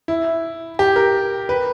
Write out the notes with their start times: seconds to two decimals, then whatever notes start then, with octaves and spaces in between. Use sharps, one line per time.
0.08 E4
0.79 G4
0.96 A#4
1.49 B4